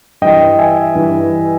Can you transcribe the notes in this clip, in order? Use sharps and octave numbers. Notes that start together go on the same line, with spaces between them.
G2 E3 D#5 G5
E5 G#5
G2 E3